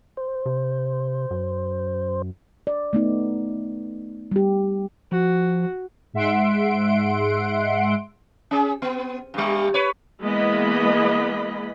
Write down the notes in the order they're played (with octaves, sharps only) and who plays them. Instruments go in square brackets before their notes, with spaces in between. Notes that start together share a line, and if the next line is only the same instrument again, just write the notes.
[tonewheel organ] C5
[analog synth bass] C3
F#2
[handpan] D5
A3 B3 D#4
G3 G4
[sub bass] F3 [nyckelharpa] F#4
[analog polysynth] G#2 G#3 E5 F#5 C6 D7
[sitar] C#4 G#4
B3
G2 G3
B4 C#5
[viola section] E3 G#3 A#3 B3 D#5 B5